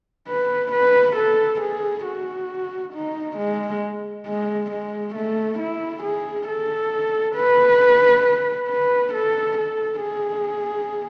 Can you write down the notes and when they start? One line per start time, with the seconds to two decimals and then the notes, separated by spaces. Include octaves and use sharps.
0.28 B4
0.72 B4
1.17 A4
1.61 G#4
2.06 F#4
2.94 D#4
3.38 G#3
4.27 G#3
4.71 G#3
5.15 A3
5.59 E4
6.03 G#4
6.48 A4
7.36 B4
8.69 B4
9.14 A4
9.57 A4
10.02 G#4